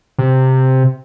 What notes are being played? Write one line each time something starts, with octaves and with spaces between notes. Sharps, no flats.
C3